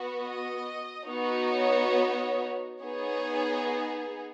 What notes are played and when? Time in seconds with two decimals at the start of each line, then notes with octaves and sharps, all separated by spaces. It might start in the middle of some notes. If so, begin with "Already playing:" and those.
Already playing: B3 F#4
0.21 D#5
1.08 B3 D#4 F#4
1.52 C#5
2.81 B3 D#4 G#4 C#5